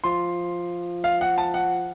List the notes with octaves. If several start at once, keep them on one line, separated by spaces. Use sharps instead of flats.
F3 C6
F5
F#5
A5
F#5